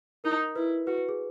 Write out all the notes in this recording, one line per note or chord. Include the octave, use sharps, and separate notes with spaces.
D#4 A#4
E4 B4
F#4 B4
B4
G#4